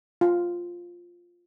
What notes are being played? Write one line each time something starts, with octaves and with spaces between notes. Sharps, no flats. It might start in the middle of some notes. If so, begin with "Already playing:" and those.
F4